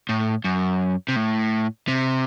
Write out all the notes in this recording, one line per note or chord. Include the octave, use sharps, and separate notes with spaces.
A2
F#2
C3
A2
C3